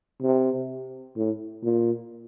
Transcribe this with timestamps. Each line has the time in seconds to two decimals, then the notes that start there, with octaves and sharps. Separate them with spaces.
0.22 C3
1.16 A2
1.63 A#2